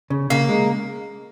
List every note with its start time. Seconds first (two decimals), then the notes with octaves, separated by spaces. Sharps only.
0.10 C#3
0.30 C#3 A#3
0.49 G#3